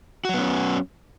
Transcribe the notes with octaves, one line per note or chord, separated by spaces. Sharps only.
F#3 B3 C#4 F#4